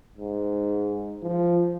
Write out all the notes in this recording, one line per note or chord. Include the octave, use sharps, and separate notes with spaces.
G#2
F3